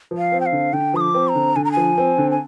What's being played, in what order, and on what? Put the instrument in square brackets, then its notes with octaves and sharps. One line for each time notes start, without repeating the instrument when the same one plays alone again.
[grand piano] F3
[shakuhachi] F5
[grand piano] C4
[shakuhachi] G5
F5
[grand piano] D3
[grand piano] D3 [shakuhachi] G5
[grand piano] F3 [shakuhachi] D#6
[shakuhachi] D6
[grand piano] C4
[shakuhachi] A#5
[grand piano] D3
[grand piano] D3 [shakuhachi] G#5
[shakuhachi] A#5
[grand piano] F3 [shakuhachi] G#5
[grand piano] C4
D3
[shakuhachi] G#5